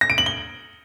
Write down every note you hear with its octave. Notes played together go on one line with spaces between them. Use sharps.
A#6
D7
F#7
G7